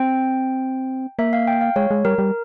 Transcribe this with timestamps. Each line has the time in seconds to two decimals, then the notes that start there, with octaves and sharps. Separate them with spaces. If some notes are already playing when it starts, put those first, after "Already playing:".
Already playing: C4 G5
1.19 A#3 E5
1.33 F5
1.47 G5
1.61 F5
1.76 G#3 C#5
1.91 G#3
2.05 G3 A#4
2.18 G3